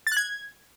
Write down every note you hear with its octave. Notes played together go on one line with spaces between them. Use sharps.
A6
F#6
G#6